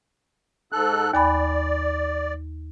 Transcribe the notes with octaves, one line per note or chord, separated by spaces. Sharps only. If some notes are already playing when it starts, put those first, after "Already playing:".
G#2 A4 F#6
D#2 D5 G#5 B5